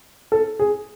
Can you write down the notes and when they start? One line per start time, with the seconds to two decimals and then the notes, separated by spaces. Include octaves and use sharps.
0.32 A4
0.59 G#4